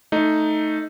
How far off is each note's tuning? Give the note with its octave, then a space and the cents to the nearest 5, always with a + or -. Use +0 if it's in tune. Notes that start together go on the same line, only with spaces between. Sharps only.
A3 +0 D#4 +0